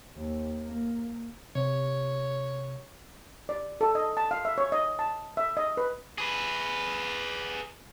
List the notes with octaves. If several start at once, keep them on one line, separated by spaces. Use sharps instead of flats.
D#2
A#3
C3 C#5
D5
A4
D#5
A5
F5
E5
C#5
D#5
A5
E5
D#5
B4
G#4 B4